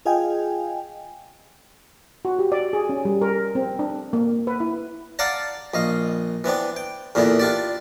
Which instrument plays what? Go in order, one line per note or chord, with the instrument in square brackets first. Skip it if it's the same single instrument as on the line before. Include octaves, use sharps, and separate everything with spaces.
[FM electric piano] F4 G#4 D#5 F5 G5 G#5
[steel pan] F#4
G4
D5
G#4
C#4
G3
A#4
C4
D4
A#3
B4
E4
[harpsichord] D5 F5 F#5 A5 A#5
A#1 D#5 F5
E3 B3 C4 D4
G5
E2 A#2 D3 B3 E4
D4 F4 G4 D5